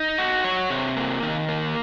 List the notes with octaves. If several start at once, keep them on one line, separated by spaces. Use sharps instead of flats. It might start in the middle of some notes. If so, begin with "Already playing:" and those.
Already playing: D#4
F#4
C#5
C3
A#3
D#3
A#3